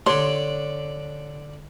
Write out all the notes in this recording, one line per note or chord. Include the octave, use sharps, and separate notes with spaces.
D3 D4 C#5 C6